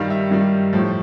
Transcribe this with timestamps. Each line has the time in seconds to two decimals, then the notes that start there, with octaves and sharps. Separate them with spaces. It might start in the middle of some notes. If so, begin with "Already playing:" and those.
Already playing: G2 D#3 G3 F5
0.10 E5
0.31 G2 D#3 G3
0.73 A2 F3